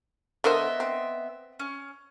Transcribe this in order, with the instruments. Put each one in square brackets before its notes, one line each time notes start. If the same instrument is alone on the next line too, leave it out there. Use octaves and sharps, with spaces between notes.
[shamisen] D3 A#4 C5 [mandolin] B3 D#5 E5
[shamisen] C4
[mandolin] C#4